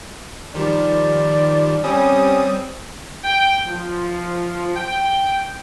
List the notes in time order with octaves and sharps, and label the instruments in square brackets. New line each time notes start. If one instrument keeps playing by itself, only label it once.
[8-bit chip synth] D#3 F3 G3 [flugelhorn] D5
[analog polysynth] G3 D#6 [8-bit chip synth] C4 [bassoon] C#4
[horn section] G5
F3
G5